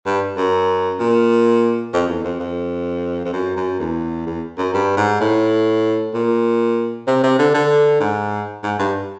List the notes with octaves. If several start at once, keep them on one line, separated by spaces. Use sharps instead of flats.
G2
F#2
A#2
F2
E2
F2
F2
F2
F#2
F#2
E2
E2
F#2
G2
G#2
A2
A#2
C3
C3
D3
D3
G#2
G#2
G2